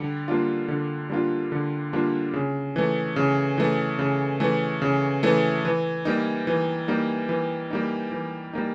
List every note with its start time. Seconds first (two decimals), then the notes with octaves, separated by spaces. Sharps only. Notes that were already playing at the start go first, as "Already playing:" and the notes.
Already playing: D3 G3
0.28 G3 A#3 D4 F4
0.68 D3
1.10 G3 A#3 D4 F4
1.52 D3
1.93 G3 A#3 D4 F4
2.33 C#3
2.76 E3 A3
3.16 C#3
3.58 E3 A3
3.99 C#3
4.40 E3 A3
4.82 C#3
5.23 E3 A3
5.65 E3
6.05 G3 A#3 D#4
6.47 E3
6.88 G3 A#3 D#4
7.29 E3
7.70 G3 A#3 D#4
8.12 E3
8.53 G3 A#3 D#4